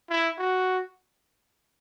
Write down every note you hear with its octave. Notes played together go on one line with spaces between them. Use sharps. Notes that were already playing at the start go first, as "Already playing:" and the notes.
E4
F#4